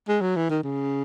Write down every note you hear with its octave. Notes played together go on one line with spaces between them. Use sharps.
G#3
F#3
E3
D#3
C#3